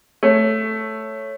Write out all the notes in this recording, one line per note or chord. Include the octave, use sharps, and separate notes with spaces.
A3 C#5